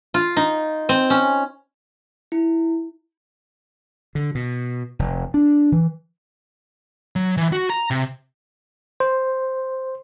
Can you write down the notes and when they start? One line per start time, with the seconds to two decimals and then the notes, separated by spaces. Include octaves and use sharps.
0.14 F4
0.37 D#4
0.89 C4
1.10 C#4
2.32 E4
4.15 D3
4.35 B2
4.99 F1
5.34 D4
5.72 E3
7.16 F#3
7.37 E3
7.53 F#4
7.70 A#5
7.91 C3
9.00 C5